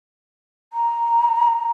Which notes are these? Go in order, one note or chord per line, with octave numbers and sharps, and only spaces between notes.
A#5